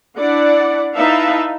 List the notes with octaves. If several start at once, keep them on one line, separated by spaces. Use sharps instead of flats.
D4 E4 D5 F#5
D#4 E4 B4 E5 F5 A5